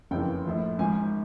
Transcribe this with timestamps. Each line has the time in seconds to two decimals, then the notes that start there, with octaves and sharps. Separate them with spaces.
0.11 F#1 F2 C#3 E3 G5
0.45 A#1 A2 F3
0.78 G#1 G#2 F3 G#5